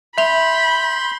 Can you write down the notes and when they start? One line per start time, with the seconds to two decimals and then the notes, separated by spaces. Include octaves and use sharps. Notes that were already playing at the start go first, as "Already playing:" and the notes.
0.18 E5 B5 C6 G6 F7